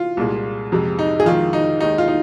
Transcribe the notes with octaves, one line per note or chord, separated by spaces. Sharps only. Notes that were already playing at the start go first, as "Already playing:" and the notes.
Already playing: F4
C2 A#2 G#3
F2 C3 G#3
D#4
G#4
F2 D#3 G#3 F4
D#4
D#2 D#3 G#3 D#4
F4
D#4